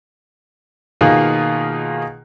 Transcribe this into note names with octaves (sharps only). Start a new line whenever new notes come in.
B2 D#3 A#3 F4 G#4